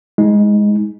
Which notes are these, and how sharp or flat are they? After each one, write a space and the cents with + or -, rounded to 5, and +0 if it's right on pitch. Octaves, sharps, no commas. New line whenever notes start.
G#3 +0 D#4 +40